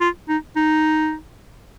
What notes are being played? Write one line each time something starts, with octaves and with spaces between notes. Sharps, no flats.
F4
D#4
D#4